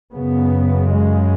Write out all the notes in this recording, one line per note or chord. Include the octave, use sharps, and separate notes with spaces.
F#2 C#3 B3
G#3